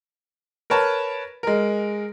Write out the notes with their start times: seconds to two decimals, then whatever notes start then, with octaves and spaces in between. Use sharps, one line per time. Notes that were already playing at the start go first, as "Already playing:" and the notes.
0.70 A#4 B4 C#5 A5
1.43 G#3 A#4